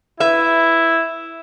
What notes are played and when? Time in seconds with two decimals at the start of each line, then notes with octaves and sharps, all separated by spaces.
0.20 E4 B4 E5